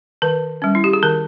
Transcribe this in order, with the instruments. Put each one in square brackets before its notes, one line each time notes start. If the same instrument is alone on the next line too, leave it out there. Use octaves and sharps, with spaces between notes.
[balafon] D#3 B4
G3 C#4
E4
G4
G#4
D#3 A#4